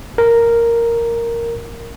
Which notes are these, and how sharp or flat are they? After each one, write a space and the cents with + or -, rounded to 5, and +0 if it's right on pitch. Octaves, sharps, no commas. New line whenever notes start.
A#4 -5